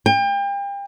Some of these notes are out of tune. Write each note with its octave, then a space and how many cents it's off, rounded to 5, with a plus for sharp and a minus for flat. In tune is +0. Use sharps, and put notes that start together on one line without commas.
G5 +35